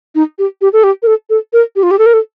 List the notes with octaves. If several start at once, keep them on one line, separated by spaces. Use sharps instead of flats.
D#4
G4
G4
A4
G4
A#4
A4
A4
A#4
G4
F4
G4
A4
A#4
A4